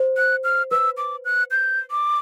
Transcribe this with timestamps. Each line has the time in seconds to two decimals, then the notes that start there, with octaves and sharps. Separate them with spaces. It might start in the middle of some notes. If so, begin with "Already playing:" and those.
Already playing: C5
0.17 F#6
0.44 F6
0.71 B4 E6
0.98 D6
1.25 F#6
1.51 G6
1.91 D6